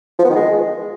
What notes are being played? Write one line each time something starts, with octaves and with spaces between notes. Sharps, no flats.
F3
B3
D#3
G#3